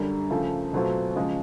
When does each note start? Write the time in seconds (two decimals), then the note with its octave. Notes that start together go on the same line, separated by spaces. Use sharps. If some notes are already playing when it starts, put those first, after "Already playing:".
Already playing: F#2 D3 G3
0.30 C#3 F3 A3
0.73 B2 F#3 A3 C4 F4
1.16 C#3 F3 G#3